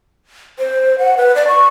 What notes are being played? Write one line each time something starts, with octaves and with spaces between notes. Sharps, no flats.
C5
F#5
B4
D5
C#6